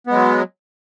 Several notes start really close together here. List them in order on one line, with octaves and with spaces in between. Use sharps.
B3 G#3 F#3